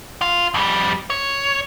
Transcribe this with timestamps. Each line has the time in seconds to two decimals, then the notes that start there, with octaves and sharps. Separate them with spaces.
0.21 F4
0.54 F2 G3
1.10 C#5